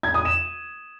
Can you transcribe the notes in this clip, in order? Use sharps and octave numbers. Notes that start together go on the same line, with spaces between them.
G#6
D#6
E7